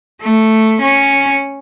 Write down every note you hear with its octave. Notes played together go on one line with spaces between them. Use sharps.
A3
C#4